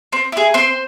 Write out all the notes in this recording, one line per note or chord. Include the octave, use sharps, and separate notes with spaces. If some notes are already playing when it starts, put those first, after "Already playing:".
C4
E4 G#4
C4 C5 C6